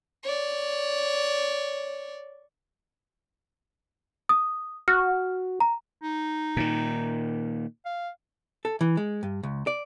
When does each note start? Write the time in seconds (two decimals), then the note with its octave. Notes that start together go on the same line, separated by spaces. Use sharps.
0.23 C#5 D5
4.29 D#6
4.88 F#4 F6
5.60 A#5
6.03 D#4
6.57 A#2 D#3
7.85 F5
8.65 A4
8.81 E3
8.97 G#3
9.23 G2
9.43 C#2
9.67 D5